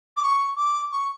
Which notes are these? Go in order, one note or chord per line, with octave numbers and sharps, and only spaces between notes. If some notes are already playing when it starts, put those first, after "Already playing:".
D6
C#6
D6
C#6